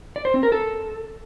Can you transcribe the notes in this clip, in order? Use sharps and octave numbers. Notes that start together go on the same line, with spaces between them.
D5
C5
C4
A#4
A4